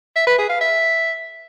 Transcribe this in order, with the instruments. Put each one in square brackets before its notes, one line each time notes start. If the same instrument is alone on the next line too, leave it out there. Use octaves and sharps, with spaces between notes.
[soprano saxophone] E5
B4
G#4
F5
E5